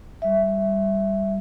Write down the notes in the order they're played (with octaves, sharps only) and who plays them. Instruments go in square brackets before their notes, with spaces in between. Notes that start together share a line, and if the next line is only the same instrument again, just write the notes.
[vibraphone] G3 E5